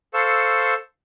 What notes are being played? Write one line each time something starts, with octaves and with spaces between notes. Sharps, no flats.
A4 C5 F5 C#6 E6